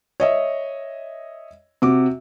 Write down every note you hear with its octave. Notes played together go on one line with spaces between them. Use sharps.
C#5 D#5 E5
C3 F#4 D6